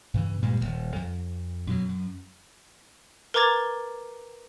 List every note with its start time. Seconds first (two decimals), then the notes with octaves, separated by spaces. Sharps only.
0.14 G2 C#3 E3
0.42 G2 A#2 G3 G#3
0.61 D#1 D#2
0.96 F2
1.67 F#2 B2 F#3
1.89 F#2
3.34 A#4 B4 A#5 D6 G#6 A6